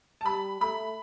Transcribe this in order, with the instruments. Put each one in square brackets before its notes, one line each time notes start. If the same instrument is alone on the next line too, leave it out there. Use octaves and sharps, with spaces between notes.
[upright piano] A5
[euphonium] G3 [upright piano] B5
[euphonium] A3 [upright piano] B5